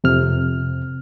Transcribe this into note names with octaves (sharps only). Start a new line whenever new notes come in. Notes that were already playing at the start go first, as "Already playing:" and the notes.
F2 C3 F6